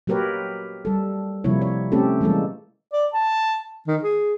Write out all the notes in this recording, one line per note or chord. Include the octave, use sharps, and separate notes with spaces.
F#3 A#3 G4 A#4 B4 C#5
G3 A4
C3 F3 G3 A#3 E4 C#5
C#5
A3 C4 C#4 G4 A4
E3 G3 G#3 A#3 A4
D5
A5
D#3
G#4